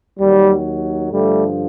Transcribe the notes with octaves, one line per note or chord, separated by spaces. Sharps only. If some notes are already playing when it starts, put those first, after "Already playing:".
D#2 D#3 F#3 G3
G2 D3 F3 G3 A3